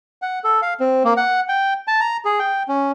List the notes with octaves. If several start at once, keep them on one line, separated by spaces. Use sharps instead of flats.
F#5
A4
F5
C4
A#3
F#5
G5
A5
A#5
G#4
G5
C#4